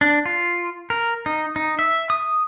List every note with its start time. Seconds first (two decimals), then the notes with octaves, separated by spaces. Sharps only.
0.01 D4
0.26 F4
0.90 A#4
1.26 D#4
1.56 D#4
1.79 E5
2.10 D#6